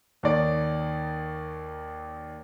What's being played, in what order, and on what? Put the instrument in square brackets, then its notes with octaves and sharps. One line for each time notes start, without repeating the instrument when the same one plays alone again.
[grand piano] D#2 D#4 C#5 D5